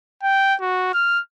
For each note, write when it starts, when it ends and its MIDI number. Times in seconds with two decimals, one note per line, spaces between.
0.23 0.55 79
0.61 0.90 66
0.94 1.20 89